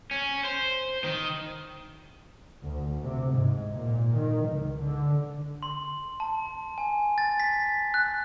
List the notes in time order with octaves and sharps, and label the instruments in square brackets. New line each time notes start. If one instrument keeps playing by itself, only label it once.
[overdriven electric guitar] C#4
C5
D#3
[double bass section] D2
C3
G#2
A#2
D#3
C#2
D3
[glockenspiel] C6
A5
G#5
A6
B6
F#6